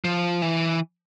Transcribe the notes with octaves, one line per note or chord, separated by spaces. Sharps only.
F3
E3